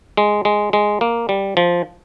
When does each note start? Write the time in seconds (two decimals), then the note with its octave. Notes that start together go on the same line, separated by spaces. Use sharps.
0.17 G#3
0.45 G#3
0.73 G#3
1.01 A#3
1.29 G3
1.57 F3